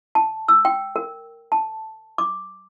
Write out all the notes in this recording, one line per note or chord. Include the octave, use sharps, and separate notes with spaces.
A5
E6
G5
A#4
A5
D6